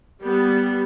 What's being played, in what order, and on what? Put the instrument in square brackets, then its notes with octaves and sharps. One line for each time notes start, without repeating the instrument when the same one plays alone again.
[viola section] G3 B3